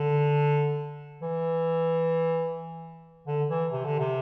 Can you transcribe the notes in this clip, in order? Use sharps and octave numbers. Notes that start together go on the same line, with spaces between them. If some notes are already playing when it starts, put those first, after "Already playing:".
Already playing: D3
E3
D3
E3
C3
D3
C3